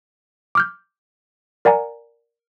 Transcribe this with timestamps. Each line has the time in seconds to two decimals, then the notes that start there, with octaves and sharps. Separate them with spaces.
0.55 D6 F6 G6
1.65 A#4 D5 F#5 G#5 A#5